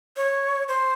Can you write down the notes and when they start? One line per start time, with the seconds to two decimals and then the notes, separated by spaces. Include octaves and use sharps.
0.16 C#5
0.68 C5